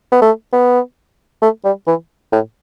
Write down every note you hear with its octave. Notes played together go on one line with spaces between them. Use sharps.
B3
A3
B3
A3
G3
E3
A2